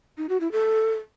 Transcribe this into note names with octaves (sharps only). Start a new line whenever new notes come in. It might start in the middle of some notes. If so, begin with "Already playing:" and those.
D#4
F#4
E4
A4